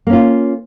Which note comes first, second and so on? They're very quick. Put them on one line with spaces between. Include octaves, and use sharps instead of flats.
A#3 C#4 F4